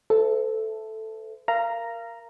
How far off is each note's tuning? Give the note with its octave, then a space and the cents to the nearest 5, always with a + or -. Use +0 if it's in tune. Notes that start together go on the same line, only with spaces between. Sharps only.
A4 +0 C5 -45 E5 +5
A#4 +0 F5 -25 A#5 +0